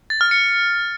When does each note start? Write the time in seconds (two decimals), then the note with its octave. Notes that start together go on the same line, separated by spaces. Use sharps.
0.10 A6
0.21 F6
0.31 C#7